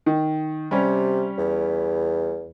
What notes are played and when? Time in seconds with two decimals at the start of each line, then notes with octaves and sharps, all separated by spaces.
0.06 D#3
0.71 C3 G3 C#4
1.38 E2